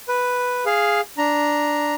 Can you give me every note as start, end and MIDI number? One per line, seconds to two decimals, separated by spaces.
0.08 0.64 71
0.66 1.01 68
0.66 1.01 77
1.18 1.95 62
1.18 1.95 82